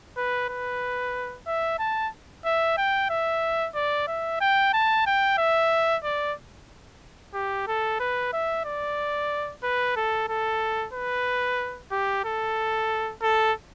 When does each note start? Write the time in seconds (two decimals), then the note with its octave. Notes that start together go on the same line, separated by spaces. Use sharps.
0.17 B4
0.49 B4
1.47 E5
1.79 A5
2.45 E5
2.77 G5
3.10 E5
3.75 D5
4.07 E5
4.41 G5
4.73 A5
5.07 G5
5.38 E5
6.04 D5
7.34 G4
7.67 A4
8.00 B4
8.33 E5
8.65 D5
9.63 B4
9.96 A4
10.29 A4
10.93 B4
11.91 G4
12.25 A4
13.22 A4